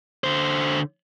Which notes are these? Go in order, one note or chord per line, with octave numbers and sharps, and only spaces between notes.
D3 C5